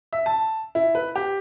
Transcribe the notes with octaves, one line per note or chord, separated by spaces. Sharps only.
E5
A5
E4
B4
G4